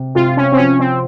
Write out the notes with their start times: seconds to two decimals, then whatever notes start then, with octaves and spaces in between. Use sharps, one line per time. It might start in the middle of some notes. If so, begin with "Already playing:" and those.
Already playing: C3
0.15 C3 F4
0.37 C#4
0.52 C4
0.57 F3 C#4
0.80 C4